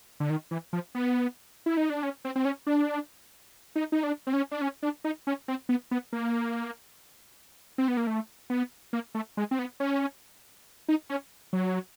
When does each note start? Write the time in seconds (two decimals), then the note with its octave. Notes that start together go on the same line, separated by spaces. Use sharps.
0.20 D3
0.30 D#3
0.51 E3
0.73 F3
0.95 B3
1.66 E4
1.77 D#4
1.90 D4
2.03 C#4
2.25 C4
2.36 C4
2.45 C#4
2.67 D4
3.76 D#4
3.92 D#4
4.03 D4
4.27 C4
4.33 C#4
4.51 D4
4.61 C#4
4.83 D4
5.04 D#4
5.27 C#4
5.48 C4
5.69 B3
5.91 B3
6.13 A#3
7.78 C4
7.88 B3
7.97 A#3
8.07 A3
8.50 B3
8.93 A#3
9.15 A3
9.37 G#3
9.51 C4
9.59 B3
9.80 C#4
10.89 D#4
11.10 C#4
11.53 F#3